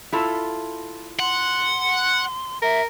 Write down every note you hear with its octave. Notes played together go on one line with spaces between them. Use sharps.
E4 F4 A4
F#5 C6
A#4 E5